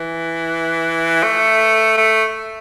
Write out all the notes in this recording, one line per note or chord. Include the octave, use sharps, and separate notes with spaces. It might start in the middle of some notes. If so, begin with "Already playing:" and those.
Already playing: E3
A3
A3